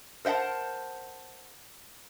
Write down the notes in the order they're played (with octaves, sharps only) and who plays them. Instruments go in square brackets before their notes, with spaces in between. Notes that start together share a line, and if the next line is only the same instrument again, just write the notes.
[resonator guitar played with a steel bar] A#4 C5 E5 F#5 A5